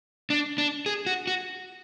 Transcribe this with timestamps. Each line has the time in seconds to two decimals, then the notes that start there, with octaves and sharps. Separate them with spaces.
0.30 D4
0.58 D4
0.86 G#4
1.06 F#4
1.27 F#4